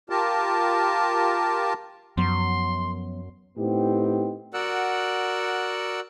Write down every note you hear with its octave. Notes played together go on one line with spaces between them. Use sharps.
F4 G4 A#4 A5
F#2 F3 F#3 B3 C6
A2 B3 C4 D#4 G4
F#4 A#4 D5 F#5 E6 F#6